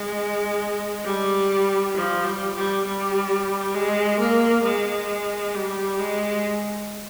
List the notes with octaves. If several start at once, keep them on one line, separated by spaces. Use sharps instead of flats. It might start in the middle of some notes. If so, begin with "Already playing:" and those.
Already playing: G#3
G3
F3
G3
G3
G3
G#3
A#3
G#3
G3
G#3